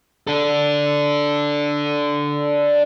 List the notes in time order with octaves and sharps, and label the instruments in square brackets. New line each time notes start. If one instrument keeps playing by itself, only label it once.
[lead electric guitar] D4 A4